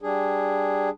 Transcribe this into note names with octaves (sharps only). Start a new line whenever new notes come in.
G3 D4 G#4